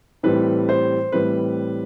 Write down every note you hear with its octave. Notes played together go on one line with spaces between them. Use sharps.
A2 E3 G3 C4 B4
C5
A2 E3 G3 C4 B4